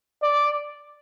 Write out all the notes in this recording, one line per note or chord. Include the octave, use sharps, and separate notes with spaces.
D5